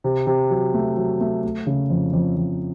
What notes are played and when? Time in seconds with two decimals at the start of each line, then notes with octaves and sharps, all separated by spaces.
0.04 C3
0.27 C3
0.50 F#3
0.74 A3
0.97 F#3
1.21 A3
1.44 A3
1.67 C#3
1.90 F2
2.13 F2
2.37 F2